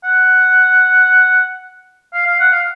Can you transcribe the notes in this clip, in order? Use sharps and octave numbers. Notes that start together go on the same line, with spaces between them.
F#5
F5
F5
F#5
F5